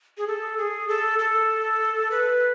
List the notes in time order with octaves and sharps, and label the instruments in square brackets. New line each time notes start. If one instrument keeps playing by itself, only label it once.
[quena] G#4
A4
G#4
A4
A4
B4